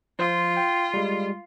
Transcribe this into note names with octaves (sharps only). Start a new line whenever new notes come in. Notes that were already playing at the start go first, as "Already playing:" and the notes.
F3 F4 C5
G5
G3 G#3